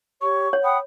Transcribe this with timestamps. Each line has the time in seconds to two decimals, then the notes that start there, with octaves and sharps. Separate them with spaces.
0.22 G4 C#5 C#6
0.53 C#5
0.64 F#5 G5 B5 D#6